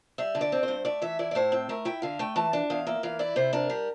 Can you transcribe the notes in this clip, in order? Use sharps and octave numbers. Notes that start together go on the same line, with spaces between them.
G3 E5
D3
D5
C4
C5
G2
A3 D5
E3 E5
E4 D5
D5
A2 C5
C4
A3 A#4
E4 G5
D3 F5
A3 G5
E3 A5
D4
E2 F5
A#3 E5
E3 F5
E4 D5
C3 C5
D4 A#4
G3